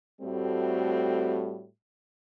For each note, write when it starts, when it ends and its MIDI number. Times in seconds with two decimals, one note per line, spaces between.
0.21 1.66 45
0.21 1.66 55
0.21 1.66 57
0.21 1.66 60
0.21 1.66 66